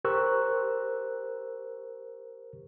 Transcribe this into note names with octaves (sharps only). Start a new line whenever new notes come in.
G4 A#4 C5 C#6 E6 F#6